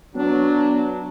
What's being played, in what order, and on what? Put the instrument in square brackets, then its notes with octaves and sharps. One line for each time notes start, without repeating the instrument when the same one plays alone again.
[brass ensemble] F#3 [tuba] B3 [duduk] D4